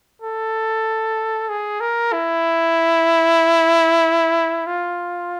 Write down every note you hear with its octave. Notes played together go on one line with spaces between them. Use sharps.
A4
G#4
A#4
E4
F4